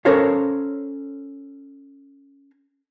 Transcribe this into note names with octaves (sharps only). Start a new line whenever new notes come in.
C#4 A4 A#4 C5 C#5 F5